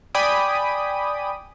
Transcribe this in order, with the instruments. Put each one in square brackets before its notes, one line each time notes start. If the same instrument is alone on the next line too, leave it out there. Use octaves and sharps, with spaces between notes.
[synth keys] D5 G5 G#5 B5 D6 D#6